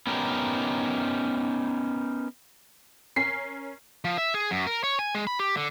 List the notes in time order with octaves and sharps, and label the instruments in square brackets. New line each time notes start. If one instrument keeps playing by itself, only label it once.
[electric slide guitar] B3 C#4 D#4 G4 A#4
[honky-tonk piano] C#4 A#4 G#5 B6 C7
[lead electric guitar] F3
E5
G#4
F#2
A#4
C#5
G#5
G#3
B5
G4
D3